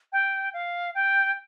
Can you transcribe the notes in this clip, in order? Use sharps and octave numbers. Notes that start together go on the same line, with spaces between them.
G5
F5
G5